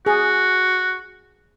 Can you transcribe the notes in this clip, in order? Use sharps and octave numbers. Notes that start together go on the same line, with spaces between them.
F#4 G#4